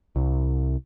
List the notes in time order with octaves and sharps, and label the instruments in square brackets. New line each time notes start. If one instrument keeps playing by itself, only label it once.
[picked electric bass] C2